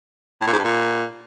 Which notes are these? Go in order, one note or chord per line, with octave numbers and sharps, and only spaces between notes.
A2
A#2
G#2
G2
A#2